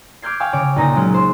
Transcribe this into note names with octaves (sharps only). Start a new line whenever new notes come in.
D6 F6 G6 G#6 C7
F5 G5 G#5 C#6 E6
C#3 C#5 D6
C#2 A#2 D#4 A#5 A#6 D#7
F#3 G#3 C#4 F#4
C5